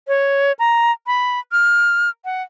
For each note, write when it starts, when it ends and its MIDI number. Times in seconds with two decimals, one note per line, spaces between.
0.08 0.52 73
0.59 0.92 82
1.07 1.39 83
1.52 2.10 89
2.25 2.42 78